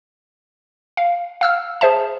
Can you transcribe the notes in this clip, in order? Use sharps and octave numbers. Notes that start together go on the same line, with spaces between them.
F5
F5 E6 F6
G#4 C5 E5 A5